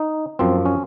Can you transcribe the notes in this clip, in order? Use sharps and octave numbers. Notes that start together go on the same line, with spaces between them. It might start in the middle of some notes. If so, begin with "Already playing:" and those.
Already playing: D#4
F#2 F3 C4
C#4